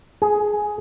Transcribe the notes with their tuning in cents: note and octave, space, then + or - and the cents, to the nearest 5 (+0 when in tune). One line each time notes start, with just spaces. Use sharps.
G#4 +10